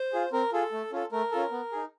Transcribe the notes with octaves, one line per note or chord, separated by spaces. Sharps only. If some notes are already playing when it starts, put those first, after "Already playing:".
Already playing: C5
F4 G#4
C4 A#4
F4 G#4 A4
A3
C#4 F4 A4
A3 A#4
C#4 F4 A4
B3
D#4 G#4